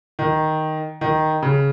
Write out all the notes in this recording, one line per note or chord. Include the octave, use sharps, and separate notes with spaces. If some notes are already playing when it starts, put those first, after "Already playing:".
D#3
D#3
C#3